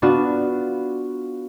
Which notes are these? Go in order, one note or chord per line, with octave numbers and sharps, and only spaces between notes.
B3 D4 F4 F#4